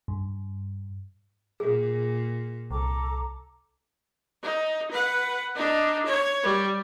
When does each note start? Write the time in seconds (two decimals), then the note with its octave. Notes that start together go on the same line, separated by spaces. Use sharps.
0.08 G2
1.60 A#2 G#4
2.71 C2 A4 A#5 D6
4.43 D#4
4.91 B4 F#5
5.55 D4 D#4
6.06 C#5
6.43 G3